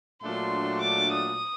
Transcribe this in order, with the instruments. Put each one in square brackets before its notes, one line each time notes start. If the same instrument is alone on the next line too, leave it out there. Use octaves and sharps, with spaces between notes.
[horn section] A#2 F#3 A3 D4 [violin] C6
[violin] D6
D#6